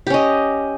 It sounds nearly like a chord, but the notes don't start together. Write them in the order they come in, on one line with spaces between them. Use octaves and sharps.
G4 C#4 D#5